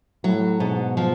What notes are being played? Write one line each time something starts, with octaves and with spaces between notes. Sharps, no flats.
A2 F#3
G#2 B2
F3